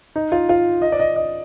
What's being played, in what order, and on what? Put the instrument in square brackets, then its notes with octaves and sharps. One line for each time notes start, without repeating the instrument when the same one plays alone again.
[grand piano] D#4
F4
F4
D#5
D5
D#5
D#5